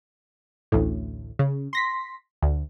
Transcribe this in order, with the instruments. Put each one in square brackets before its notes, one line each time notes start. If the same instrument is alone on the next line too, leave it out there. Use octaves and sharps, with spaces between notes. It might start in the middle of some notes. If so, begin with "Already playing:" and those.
[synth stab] A1 D2 A2
C#3
C6 A#6 B6
D2